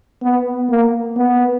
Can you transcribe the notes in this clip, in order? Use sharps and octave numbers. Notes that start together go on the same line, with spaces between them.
B3
A#3
B3